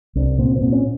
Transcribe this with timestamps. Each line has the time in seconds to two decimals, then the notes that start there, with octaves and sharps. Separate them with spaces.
0.15 C2 D4
0.38 A#2 C4
0.56 C4
0.61 A#2
0.72 C#4